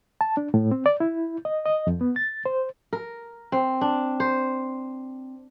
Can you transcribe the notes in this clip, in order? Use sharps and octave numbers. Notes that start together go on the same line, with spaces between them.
A5
D4
A2
C4
D5
E4
D#5
D#5
F2
B3
A6
C5
A#4
C4
D4
C5